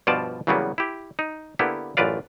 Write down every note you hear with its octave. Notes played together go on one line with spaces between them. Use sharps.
G2 B2 F3 F4 D5 A5
E2 C#3 F#3 G3 A#3 B3
E4 G4
D#4
D3 A#3 B3 E4 G4
A1 F#2 F4 B4 D5 F5